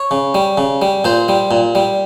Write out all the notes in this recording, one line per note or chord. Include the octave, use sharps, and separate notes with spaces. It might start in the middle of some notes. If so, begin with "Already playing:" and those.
Already playing: C#5
C#3
G3
C#3
G3
A#2 C5
G3
A#2
G3